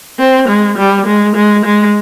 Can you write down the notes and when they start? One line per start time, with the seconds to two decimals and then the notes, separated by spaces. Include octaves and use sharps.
0.19 C4
0.48 G#3
0.78 G3
1.06 G#3
1.36 G#3
1.65 G#3